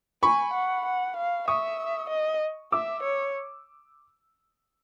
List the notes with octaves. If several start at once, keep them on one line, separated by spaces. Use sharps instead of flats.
G#5 B5 C#6
F#5
F#5
F5
E5 C#6 D#6
D#5
E5 D6 E6
C#5